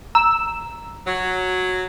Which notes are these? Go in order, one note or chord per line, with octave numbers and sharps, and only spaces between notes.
A#5 E6
F#3